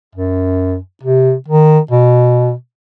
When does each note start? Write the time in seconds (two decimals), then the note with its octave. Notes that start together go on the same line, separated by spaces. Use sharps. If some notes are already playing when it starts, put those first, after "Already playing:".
0.15 F#2
1.03 C3
1.48 D#3
1.91 B2